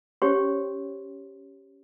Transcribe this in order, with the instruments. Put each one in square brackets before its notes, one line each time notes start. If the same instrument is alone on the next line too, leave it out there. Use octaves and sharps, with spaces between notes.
[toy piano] C#4 G4 C5 C#5 G5 C6